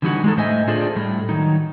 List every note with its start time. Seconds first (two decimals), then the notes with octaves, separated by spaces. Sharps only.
0.02 D3 E3 G3 D#4 F4 F#4
0.24 G#3 D#4 A4
0.37 A2 C5 D#5 E5 G#5
0.68 D4 F4 G#4 A4 C5 D5
0.95 A2 G3 A3
1.29 D#3 F#3 D#4